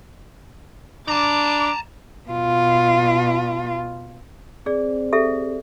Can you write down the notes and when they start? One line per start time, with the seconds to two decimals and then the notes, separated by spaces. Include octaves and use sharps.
1.08 D4 A5 A#5 D6
2.30 B2 F4
4.66 C4 G#4 D5
5.13 G4 A4 E5